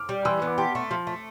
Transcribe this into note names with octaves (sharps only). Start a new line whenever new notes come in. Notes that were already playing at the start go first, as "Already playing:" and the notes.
Already playing: D6 F6
G3
E3 C6 E6
B3
B5 D6
G4 A5 C6
A3
F3
A3